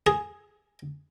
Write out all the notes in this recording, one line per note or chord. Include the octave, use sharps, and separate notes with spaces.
G#4